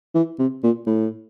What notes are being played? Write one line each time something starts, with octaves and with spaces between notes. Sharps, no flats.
E3
C3
A#2
A2